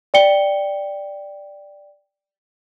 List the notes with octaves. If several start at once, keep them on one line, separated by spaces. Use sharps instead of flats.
D5 G5 C#7 G7